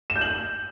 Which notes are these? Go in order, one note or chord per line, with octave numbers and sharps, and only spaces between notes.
E7
G6
F#7